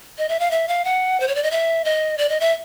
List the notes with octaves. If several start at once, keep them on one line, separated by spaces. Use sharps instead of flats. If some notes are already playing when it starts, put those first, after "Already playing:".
D#5
E5
F5
E5
F5
F#5
C5
C#5
D5
D#5
E5
D#5
D5
D#5
E5